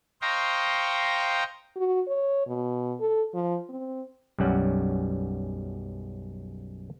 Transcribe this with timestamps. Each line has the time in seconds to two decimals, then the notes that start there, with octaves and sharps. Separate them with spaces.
0.22 C5 D#5 F5 G5 A#5 C#6
1.76 F#4
2.07 C#5
2.47 B2
3.00 A4
3.34 F3
3.70 C4
4.38 B1 F#2 G3 C#4 F#5